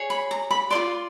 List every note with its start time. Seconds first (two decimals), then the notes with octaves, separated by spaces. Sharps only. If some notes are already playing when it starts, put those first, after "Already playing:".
Already playing: G#4 C#5
0.10 B5
0.31 A#5
0.51 B5
0.70 A4 D5 C6
0.75 F4